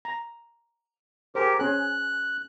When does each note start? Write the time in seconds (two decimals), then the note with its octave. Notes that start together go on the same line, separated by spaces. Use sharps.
0.05 A#5
1.35 G4 G#4 A#4 C5
1.59 C#4 G#4 F#6